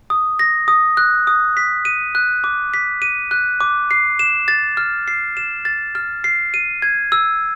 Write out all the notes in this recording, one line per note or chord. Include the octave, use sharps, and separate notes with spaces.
D#6
A#6
D#6
F#6
D#6
B6
D#7
F#6
D6
B6
D#7
F#6
D6
C7
E7
A6
F6
C7
E7
A6
F6
C7
D#7
G#6
E6